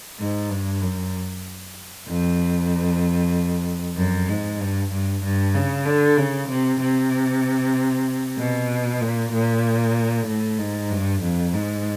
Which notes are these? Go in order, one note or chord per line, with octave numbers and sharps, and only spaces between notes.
G#2
G2
F#2
F2
F#2
G#2
G2
G2
G2
C#3
D3
C#3
C3
C3
B2
A#2
A#2
A2
G#2
G2
F2
G#2